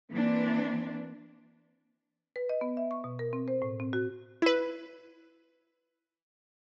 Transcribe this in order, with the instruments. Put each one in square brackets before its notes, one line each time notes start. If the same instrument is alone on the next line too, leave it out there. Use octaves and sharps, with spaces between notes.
[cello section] E3 A#3 C4 D4
[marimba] B4
D#5
B3
E5
C#6
B2
A#4
C4
C5
A2
C4
F#4
[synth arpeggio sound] E4 B4